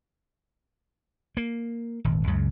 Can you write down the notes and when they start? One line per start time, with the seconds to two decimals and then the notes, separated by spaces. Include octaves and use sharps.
1.37 A#3
2.04 D#1 G#1
2.27 C#2 F#2 C#3